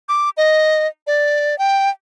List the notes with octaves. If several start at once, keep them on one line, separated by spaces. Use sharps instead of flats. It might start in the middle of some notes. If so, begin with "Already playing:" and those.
D6
D#5
D5
G5